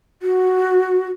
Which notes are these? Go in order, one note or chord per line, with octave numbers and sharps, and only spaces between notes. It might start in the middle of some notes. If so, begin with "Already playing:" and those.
F#4